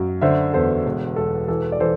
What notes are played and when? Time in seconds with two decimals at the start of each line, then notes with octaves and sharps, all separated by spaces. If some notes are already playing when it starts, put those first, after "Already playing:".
Already playing: F#2 F#3
0.21 D3 C5 E5
0.53 E2 A4 C5
0.86 E1
1.16 E1 A4
1.48 E3 A4
1.72 D5
1.80 E3 A4 C5